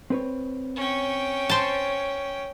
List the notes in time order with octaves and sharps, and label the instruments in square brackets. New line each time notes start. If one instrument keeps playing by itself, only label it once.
[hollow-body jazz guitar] C4 B4 C#5
[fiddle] C#4 G5
[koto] C5 A5